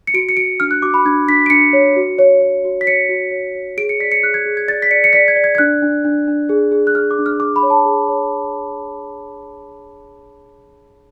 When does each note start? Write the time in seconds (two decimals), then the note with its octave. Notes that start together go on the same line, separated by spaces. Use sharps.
0.07 C#7
0.14 F#4 D7
0.29 C#7
0.37 F#4 D7
0.60 D4 F6
0.71 F#6
0.82 F#4 D6
0.94 B5
1.05 D4 G#6
1.28 D4 B6
1.46 D7
1.50 D4 C#7
1.73 C#5
1.96 F#4
2.19 C#5
2.41 C#5
2.64 F#4
2.81 B6
2.87 C#5 C#7
3.09 F#4
3.31 C#5
3.55 C#5
3.77 G#4 D7
3.89 C#7
4.00 D5 B6
4.12 C#7
4.23 G#4 F#6
4.34 G#6
4.46 G#4
4.57 G#6
4.68 D5 A6
4.82 B6
4.91 D5 C#7
5.04 C#7
5.13 D5 B6
5.28 G#6
5.36 D5
5.44 G#6
5.55 G#6
5.58 D4 F#6
5.82 D4
6.05 D4
6.28 D4
6.49 G#4
6.72 G#4
6.87 F#6
6.95 G#4 F6
7.11 D6
7.18 D4
7.26 F6
7.40 G#4 D6
7.56 B5
7.63 C#5
7.70 A5
7.85 G#4
8.08 C#5